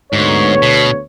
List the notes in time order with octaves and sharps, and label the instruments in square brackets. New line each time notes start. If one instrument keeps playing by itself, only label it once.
[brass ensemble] D2 B3 C#5 [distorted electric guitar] G#2
[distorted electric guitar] B2